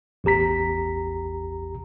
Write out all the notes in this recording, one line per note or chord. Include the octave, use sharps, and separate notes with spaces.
A1 E2 G4 A#5 B6